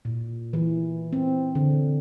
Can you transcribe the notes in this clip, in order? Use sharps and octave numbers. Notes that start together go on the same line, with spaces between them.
A#2
E3
C4
D3